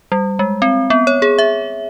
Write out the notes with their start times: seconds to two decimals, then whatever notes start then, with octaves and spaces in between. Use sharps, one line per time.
0.12 G3
0.39 G#3
0.62 C4
0.90 B3
1.07 C#5
1.22 G#4
1.38 E5